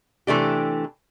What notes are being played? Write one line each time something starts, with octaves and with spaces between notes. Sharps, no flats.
C3 E3 A3 D4 G4